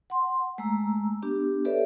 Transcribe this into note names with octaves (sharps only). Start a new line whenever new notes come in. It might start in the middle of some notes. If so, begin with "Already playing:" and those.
F#5 C6
G#3 A3 A#5 E6
B3 D4 G4
G4 A4 B4 C#5 D5 E5